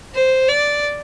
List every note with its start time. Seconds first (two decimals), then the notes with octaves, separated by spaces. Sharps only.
0.14 C5
0.49 D5